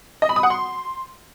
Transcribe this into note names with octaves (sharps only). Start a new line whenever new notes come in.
D#5
B5
D#6
F#5
C6